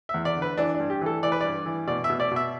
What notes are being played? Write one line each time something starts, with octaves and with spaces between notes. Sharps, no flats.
E2 E5
D5
D3
B4
E3 D4
D4
G2
G4
E3 A4
E3 D5
B4
G2 D5
E3
B2 D5
E5
B2
D5
B2 E5